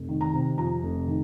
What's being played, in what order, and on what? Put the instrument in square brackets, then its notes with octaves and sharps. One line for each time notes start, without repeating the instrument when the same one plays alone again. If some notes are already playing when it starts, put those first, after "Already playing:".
Already playing: [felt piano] F1
D#3
A#5
C3
F2 A#5
F1
D#3